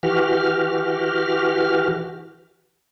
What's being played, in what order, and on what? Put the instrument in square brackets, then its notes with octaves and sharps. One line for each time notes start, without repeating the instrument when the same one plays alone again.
[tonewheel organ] E3 F#4 G4 F6